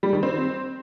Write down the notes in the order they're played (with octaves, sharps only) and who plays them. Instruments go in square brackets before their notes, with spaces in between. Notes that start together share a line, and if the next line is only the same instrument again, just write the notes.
[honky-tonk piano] G3
D#3
C4